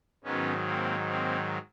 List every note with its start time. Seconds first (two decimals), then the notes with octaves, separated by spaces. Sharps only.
0.24 G#2 D#3 F#3 B3 C#4
0.66 A#3 C4
1.08 A#3 C4